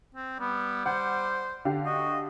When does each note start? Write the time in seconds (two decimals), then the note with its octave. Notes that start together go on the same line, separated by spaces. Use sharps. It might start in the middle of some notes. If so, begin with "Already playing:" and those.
0.15 C4
0.40 G3 B3
0.86 C5 F#5
1.65 D3 G4 F5
1.86 F#4 D#5